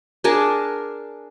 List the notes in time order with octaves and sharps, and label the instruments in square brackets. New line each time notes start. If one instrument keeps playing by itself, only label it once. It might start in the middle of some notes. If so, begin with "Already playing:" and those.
[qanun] D4 G#4 A#4 A5